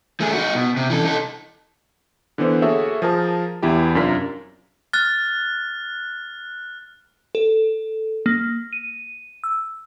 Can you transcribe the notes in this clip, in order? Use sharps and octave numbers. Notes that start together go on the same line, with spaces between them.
A3 G#4
D#4 F#4
B2
C3
E3 A4
D#4 A4
D3 E3 B3 C5
A#3 F#4 G#4 A4 C#5 E5
F3 G#4 A#4 A5
E2 E4 G4
F#2 C3 D4 F4 A#4 B6
F6 F#6 A6
A4
A#3
D#7
E6